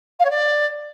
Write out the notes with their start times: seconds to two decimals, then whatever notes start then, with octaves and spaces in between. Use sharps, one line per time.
0.19 F5
0.24 C#5
0.30 D5